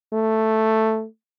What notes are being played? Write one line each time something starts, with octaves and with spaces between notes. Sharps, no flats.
A3